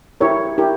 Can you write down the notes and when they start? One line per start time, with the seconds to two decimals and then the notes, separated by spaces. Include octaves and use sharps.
0.21 E4 G4 A#4 C#5
0.58 E4 G4 A#4